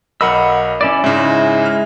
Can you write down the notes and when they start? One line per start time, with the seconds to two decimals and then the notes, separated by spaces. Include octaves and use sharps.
0.21 B1 A#4 D#5 F#5 B5 E6
0.81 C#4 E4 D5
1.04 G#2 C#3 G#3 E4
1.66 F6